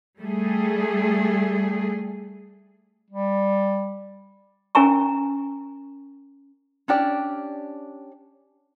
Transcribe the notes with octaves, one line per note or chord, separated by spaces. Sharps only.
G3 A3 G#4
G3
C#4 A#4 G#5 A#5 C#6
C#4 D4 G4 D5